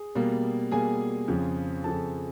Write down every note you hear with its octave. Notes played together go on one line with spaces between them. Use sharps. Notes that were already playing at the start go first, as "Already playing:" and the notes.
Already playing: G#4
B2 G3 A#3
B2 G3 A#3 G#4 G#5
F2 C#3 F3
F2 C#3 F3 A4 A5